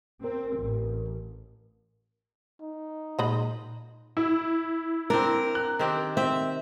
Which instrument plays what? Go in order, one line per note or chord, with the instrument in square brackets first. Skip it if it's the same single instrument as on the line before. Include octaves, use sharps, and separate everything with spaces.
[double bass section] C4 [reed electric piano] A#4
[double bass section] A1
[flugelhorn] D#4
[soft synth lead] A#2 [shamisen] G#3 D#5 B5
[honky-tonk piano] E4
[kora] C4 D4 [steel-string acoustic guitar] A#4
[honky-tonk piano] F#6
[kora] D#3 C4 G4
[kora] C4 [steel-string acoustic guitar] E5